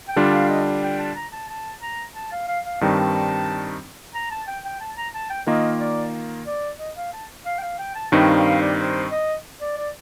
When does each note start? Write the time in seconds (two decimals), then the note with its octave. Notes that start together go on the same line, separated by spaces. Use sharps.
0.08 G5
0.16 D3 G3 D4 F4 A5
0.33 F5
0.49 D#5
0.83 G5
0.99 A5
1.15 A#5
1.32 A5
1.49 A5
1.82 A#5
2.15 A5
2.32 F5
2.48 F5
2.65 F5
2.81 G2 D#3 G3 C4 D#4 A5
4.14 A#5
4.31 A5
4.47 G5
4.64 G5
4.80 A5
4.97 A#5
5.14 A5
5.30 G5
5.47 D#3 A#3 F4 A#4 D#5
5.80 D5
6.46 D5
6.79 D#5
6.96 F5
7.13 A5
7.46 F5
7.58 G5
7.62 F5
7.78 G5
7.95 A5
8.12 G2 D#3 G3 C4 D#4 G5
8.28 F5
8.45 F5
8.61 D5
8.78 C5
9.11 D#5
9.61 D5
9.77 D5